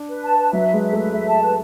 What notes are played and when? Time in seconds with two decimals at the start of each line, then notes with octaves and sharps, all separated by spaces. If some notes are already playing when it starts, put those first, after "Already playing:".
Already playing: D4
0.09 B4
0.23 A5
0.38 B4
0.53 F#3 E5
0.68 B4
0.73 G#3
0.83 E5
0.93 A3
0.98 B4
1.12 G#3 E5
1.27 A5
1.42 B4